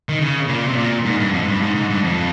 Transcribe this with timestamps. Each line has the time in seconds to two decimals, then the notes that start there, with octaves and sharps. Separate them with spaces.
0.09 D#3
0.20 C#3
0.48 A#2
0.67 C3
0.77 A#2
1.05 G#2
1.19 G2
1.33 F2
1.41 G#2
1.48 G2
1.62 G#2
1.75 G#2
1.90 G2
2.04 F2